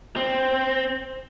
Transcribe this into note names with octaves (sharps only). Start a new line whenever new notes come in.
C4